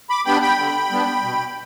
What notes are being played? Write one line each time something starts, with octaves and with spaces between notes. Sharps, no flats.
B5 D6
G3 B3 D4 G5 B5
G5 B5
D3
G3 B3 D4
B2